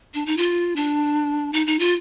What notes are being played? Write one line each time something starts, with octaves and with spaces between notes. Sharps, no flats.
D4
D#4
F4
D4
D#4
D#4
F4